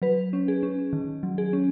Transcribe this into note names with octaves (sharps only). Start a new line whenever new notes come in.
F#3 B4
C#4
G#4
C#4
D#3
F#3
G#4
C#4